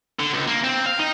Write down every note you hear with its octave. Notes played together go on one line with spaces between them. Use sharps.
D3
C#2
A#3
C4
F5
D#4